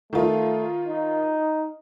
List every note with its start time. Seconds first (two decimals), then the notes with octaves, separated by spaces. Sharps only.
0.13 D#3 A3 F4
0.87 D#4